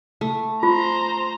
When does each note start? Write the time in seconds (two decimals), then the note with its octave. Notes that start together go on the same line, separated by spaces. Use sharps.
0.21 A3
0.63 F4 C5 A#5